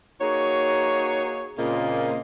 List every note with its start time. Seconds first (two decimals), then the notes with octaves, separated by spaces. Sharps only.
0.20 A#3 D#4 F#4 G#4 C#5
1.57 A#2 C#3 A#3 C4 F4 D#5